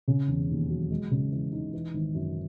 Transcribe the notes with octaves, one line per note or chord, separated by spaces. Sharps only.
C#3
E1
D#2
F#3
G#3
C#3
E3
D#4
E3
G#1
F#2